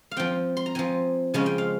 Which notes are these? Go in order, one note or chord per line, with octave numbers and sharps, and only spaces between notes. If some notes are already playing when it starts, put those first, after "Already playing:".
F5
F3 C4 G5
C6
A#5
F3 C4 G#5
C#3 F3 G#3 C#4 G#5
G5
F5